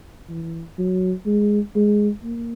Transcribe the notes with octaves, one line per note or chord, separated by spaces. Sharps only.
E3
F#3
G#3
G#3
A#3